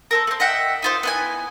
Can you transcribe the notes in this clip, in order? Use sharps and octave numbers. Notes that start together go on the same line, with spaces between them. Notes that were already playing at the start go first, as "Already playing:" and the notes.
C4 A4 A#4
A3 C4
D#5 E5 F#5 G5
D#4 F4 C5
B3 E4 G#5